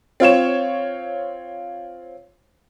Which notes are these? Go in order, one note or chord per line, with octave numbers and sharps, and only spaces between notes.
C4 F4 C#5 E7